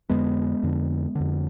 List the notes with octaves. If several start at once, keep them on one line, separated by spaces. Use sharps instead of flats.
F2 D3 G#3 B3
F2 D3
F2 D3